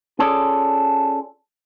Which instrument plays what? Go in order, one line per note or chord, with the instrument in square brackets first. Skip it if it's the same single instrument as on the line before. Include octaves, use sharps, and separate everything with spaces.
[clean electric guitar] C#4 F4 G#4 A4 C#5 D5